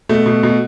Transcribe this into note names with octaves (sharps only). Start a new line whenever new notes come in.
B2 A3
B2
B2